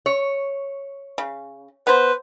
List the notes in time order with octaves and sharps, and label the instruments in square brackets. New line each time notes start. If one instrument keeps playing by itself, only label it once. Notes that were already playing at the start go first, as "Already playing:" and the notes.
[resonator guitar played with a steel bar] C#5
[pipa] C#3
[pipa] B3 C5 [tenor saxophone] B4